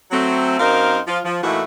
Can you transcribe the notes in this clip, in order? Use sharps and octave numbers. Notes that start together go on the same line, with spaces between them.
F#3 A3 C4
F#2 C4 D#4 A#4 C5 F5
F3 F4
F3
A2 E3 A3 A#3 D#4 F#4